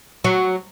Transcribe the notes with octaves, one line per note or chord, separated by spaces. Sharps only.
F#3